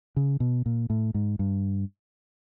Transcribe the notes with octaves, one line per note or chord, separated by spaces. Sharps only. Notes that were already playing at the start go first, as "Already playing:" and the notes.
C#3
B2
A#2
A2
G#2
G2